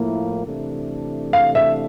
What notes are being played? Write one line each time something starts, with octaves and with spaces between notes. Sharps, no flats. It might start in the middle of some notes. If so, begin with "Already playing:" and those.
Already playing: A2 F3 A#3 E4
C3 E3 A3 D4 A4
F5
E5